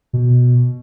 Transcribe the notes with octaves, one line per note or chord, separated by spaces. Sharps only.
B2